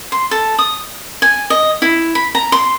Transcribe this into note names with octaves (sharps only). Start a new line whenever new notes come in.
C6
A4
D#6
G#5
D#5
E4
B5
A#5
C6